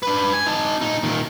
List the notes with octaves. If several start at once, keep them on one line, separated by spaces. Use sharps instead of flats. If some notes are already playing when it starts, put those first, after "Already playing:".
D4 B4
G#5
D#4 A5
A#2 D#4
A#2 D#3